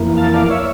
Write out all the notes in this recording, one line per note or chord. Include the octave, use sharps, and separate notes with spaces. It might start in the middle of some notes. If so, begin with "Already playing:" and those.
Already playing: F2 E3 A#3
F5 A5
D5 F5
C#5 E5